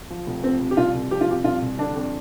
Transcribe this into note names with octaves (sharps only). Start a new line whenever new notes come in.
F3
F1
F3 C4
C3
G4
C2 F4
C2
F3 G4
F4
C3 G4
C2 F4
C2
D3 D4
F2